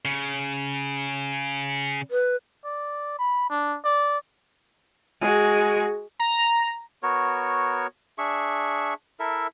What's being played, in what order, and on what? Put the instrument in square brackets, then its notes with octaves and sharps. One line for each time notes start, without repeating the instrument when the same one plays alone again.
[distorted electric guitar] C#3
[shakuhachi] B4
[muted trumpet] D5
B5
D4
D5
[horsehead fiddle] G#3 F#4
[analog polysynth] A#5
[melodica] B3 F#4 A#4 C#5
D4 G#4 E5 C#6
E4 A4 A#4 E5